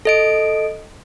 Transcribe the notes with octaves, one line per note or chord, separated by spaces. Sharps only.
A4 D#5 D7